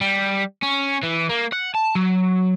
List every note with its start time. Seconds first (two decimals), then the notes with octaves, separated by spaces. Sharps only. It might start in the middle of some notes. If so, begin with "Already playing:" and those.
0.01 G3
0.63 C#4
1.03 E3
1.29 A#3
1.53 F#5
1.75 A5
1.95 F#3